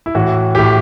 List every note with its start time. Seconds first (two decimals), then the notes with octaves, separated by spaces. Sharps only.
0.06 E4
0.15 A2 E3 F#4
0.55 A2 E3 G4